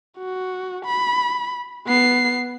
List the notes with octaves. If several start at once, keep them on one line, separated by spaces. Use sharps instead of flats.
F#4
B5
B3 C7